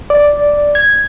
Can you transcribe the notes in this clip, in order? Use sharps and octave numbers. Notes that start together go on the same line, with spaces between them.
D5
G#6